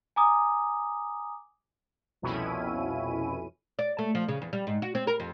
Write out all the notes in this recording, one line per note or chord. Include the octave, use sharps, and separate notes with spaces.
G#5 A#5 D6 D#6
C2 F2 B2 C#4 E4 D#7
D5
A3
F3
C#3
E2
G3
G#2
F#4
C4
A#4
F2